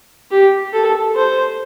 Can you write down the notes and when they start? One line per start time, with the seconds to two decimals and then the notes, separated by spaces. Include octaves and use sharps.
0.31 G4
0.73 A4
1.15 C5